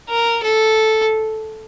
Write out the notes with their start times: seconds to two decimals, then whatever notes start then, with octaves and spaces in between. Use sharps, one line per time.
0.09 A#4
0.43 A4